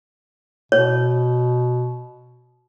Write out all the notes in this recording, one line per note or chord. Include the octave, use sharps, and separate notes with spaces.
B2 C#5